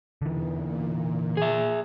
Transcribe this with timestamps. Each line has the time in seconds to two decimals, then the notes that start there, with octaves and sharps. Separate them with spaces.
0.22 E2 D3 E3
0.59 A#2
1.37 G#4 E5